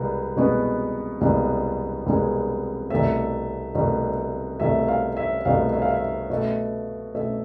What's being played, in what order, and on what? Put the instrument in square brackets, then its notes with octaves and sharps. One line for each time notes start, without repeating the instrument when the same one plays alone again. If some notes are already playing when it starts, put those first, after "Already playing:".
Already playing: [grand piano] C2 B2 G#3 B3
C2 B2 G#3 B3
C2 B2 G#3 B3
C2 B2 G#3 B3
C2 B2 A3 E5
C2 B2 A3
C2 B2 A3 E5
F5
E5
C2 B2 A3 F5
E5
F5
E5
B2 A3
B2 A3 E5